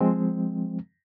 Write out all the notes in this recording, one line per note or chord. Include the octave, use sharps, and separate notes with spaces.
F3 G#3 C4